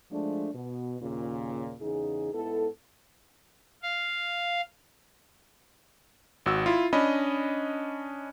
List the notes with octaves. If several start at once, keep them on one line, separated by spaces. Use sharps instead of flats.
F3 G#3 A3 D4
B2
D#2 A#2 C#3
E2 C#3 D#4 G#4
G#2 B3 E4 A4
F5
G#1 F#4 E6
E4 F4
C#4 D4 D#5 B5